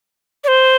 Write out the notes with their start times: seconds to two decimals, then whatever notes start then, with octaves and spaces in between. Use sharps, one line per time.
0.44 D5
0.48 C5